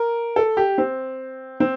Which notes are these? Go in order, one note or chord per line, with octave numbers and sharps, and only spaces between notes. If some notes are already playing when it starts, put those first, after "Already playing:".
Already playing: A#4
A4
G4
C4
C4